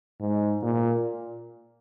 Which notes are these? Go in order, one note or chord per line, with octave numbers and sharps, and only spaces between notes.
G#2
A#2